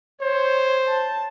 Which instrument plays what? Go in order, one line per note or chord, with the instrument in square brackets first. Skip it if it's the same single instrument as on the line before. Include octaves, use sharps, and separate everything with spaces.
[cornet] C5 [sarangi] C#5
[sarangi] A5